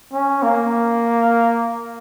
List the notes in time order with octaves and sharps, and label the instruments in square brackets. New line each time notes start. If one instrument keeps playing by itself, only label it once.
[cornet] C#4
A#3